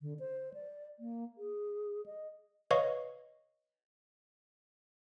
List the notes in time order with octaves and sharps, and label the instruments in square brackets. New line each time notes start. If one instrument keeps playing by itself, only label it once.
[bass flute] D3
C5
D5
A#3
G#4
D#5
[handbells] B4 C#5 D#5 F5 C#6